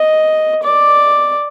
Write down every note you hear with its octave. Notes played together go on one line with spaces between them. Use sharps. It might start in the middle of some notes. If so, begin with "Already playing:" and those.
Already playing: D#5
D5